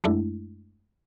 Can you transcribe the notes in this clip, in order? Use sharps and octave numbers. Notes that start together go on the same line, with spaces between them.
F#2 G#3 A3 D4 E4